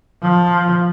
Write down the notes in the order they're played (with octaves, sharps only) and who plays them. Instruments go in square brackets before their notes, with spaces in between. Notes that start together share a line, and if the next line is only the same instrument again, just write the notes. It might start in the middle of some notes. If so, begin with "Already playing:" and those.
[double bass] F3